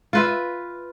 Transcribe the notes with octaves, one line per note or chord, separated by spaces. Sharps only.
F4 B4 E5